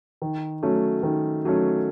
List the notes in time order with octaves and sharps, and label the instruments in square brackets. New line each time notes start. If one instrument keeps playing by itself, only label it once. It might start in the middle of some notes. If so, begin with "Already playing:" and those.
[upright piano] D#3
F#3 A3 C#4
D#3
F#3 A3 C#4